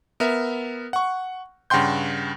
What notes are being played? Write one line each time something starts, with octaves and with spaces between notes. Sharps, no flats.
B3 A#4 E5
F#5 C#6
G2 C#3 F#5 G5 C6 G6